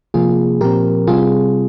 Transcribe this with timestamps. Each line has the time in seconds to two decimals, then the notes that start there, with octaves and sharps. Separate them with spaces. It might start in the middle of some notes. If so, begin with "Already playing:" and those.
0.14 C3 F3 A#3 F4 G#4
0.61 A#2 F3 C4 G4 A#4
1.07 C3 G3 C4 F4 G#4